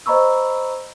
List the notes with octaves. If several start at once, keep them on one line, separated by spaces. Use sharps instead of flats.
C5 D#5 A#5 B5 C#6 E6